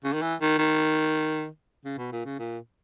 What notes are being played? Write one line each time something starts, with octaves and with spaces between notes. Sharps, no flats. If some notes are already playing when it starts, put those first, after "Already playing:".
C#3
D#3
E3
D#3
D#3
C#3
B2
A#2
C#3
A#2